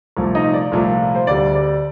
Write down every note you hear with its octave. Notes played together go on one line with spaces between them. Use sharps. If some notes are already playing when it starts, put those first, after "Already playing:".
C2 A#2 F3 A3
D#4 D#5
D5
C2 A#2 F3 A3
C5
D2 D3 G3 D5
D5